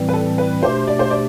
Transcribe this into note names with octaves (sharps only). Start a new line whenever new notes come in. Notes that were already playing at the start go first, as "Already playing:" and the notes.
Already playing: A2 E3 G3 C4
B4
A4
B4
B2 A3 D4 G4 C5
D5
C5
D5